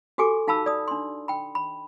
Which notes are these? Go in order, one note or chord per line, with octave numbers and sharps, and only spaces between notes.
F#4 G4 A4 G#5 D6
D#4 F5 A5 B5 E6
D5 D#6
D4 C6
G5 B5
B5